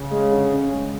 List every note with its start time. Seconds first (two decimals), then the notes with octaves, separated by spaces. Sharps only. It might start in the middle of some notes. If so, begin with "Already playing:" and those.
Already playing: C#3
0.11 G#3
0.32 D3
0.53 C#4
0.73 G#3